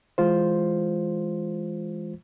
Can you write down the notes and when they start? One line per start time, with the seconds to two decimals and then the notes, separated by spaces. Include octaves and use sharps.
0.18 E3 G#3 F4 C5